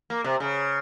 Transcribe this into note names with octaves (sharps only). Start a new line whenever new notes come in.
A#3
C3
C#3